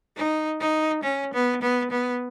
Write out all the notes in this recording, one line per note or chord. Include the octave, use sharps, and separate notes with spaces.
D#4
D#4
C#4
B3
B3
B3